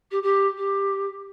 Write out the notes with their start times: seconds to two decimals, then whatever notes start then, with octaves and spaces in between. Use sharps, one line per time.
0.11 G4
0.23 G4
0.57 G4